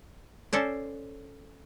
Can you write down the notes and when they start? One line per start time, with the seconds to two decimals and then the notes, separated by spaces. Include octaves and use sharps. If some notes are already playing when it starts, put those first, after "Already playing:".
0.53 C#4 A4 C5 D5